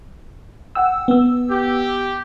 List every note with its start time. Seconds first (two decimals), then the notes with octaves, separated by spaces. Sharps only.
0.75 F#5 G5 E6
1.08 B3 E6
1.51 G4